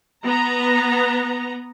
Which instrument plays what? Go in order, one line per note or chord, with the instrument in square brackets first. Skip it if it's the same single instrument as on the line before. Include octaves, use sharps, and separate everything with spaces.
[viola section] B3 A#5